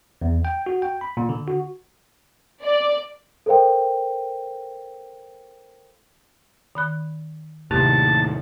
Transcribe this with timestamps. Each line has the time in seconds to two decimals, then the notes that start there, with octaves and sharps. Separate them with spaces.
0.22 E2
0.45 G5
0.66 F#4
0.82 G5
1.01 B5
1.17 A#2
1.29 D3
1.48 F#4
2.62 D5
3.46 A4 A#4 C5 F5 G5
6.75 D#3 B5 F#6
7.71 D#2 A2 C3 G4 A5